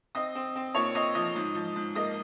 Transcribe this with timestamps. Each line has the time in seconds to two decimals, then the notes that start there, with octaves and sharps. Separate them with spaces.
0.15 C4 D#5 D#6
0.35 C4
0.56 C4
0.75 A#2 C#5 C#6
0.95 C4 D#5 D#6
1.15 F3 D#5 D#6
1.36 G#2
1.55 F3
1.76 G#2
1.95 A#3 D#5 D#6